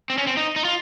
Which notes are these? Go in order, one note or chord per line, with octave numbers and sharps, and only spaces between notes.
C4
C#4
C4
D#4
D#4
F4